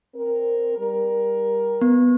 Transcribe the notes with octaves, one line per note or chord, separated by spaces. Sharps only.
C4 A#4
G3 A#4
B3